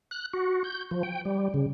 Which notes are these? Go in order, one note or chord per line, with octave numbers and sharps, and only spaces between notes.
F#6
F#4
G6
F3
G5
G3
C#3